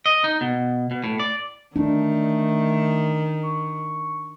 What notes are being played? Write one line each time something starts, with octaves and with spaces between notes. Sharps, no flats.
D#5
D#4
B2
B2
A2
D5
D#3 A3 D4
C#6